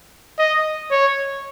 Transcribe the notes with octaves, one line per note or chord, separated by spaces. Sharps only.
D#5
C#5